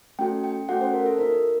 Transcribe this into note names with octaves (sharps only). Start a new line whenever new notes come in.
A3 C#4 F#4 A4 G5
G5
A3 C#4 F#4 A4 F#5
C5
A#4
A4
A#3 D#4 F#4 A#4